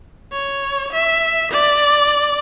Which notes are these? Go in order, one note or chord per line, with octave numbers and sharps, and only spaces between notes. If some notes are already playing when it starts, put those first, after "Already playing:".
C#5
E5
D5